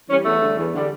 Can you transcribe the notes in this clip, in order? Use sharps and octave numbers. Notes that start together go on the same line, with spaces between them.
E3 G3 C#4
E2 A3
D3 G3
E2
D3 G3